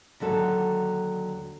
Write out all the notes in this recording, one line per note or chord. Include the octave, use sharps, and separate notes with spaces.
D#2 D3 F#3 A4